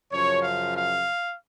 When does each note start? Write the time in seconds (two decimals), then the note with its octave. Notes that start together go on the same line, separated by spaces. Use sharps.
0.11 F#2 C#3 F3 C#5
0.42 F5
0.74 F5